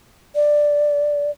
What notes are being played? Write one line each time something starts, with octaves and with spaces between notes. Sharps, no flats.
D5